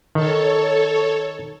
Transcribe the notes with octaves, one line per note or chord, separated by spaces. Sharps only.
D#3 A4 C#5